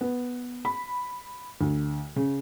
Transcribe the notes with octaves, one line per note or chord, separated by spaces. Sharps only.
B3
B5
D2
C#3